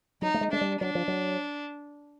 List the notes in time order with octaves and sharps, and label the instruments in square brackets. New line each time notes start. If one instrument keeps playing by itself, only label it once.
[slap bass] F#3 [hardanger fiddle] D#4
[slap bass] A3
G#3
[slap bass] G#3 [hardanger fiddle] D4
[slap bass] G3
[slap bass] F#3 [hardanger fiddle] D4
[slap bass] F3
F#3